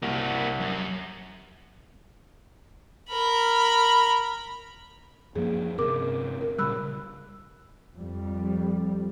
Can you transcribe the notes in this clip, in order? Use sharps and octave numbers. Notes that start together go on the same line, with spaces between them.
C2 A#3 F#4
F#2
A#4 B5
F#2 F3 A#3 G#4
G1 C3 A#4 D6
A#4
A#2 C#3 G3 B5 E6 F#6
F2 G3